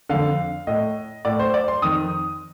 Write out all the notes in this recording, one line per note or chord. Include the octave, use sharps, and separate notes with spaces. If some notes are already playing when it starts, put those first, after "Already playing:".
F2 D3 F5
A2 D#5
A2 D5
C5
D5
C6
F2 D#3 D#6